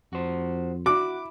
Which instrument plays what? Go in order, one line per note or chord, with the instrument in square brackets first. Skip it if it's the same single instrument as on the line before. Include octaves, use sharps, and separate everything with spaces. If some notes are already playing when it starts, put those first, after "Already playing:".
[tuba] F2 [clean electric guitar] F#4 C5
[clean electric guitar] E4 [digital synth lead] F#4 [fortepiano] D6